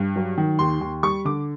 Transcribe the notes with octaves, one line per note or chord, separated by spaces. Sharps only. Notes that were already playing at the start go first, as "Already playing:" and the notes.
Already playing: G2
F#3
D#3
D#2 C6
D#2
G3 C#6
D3 D6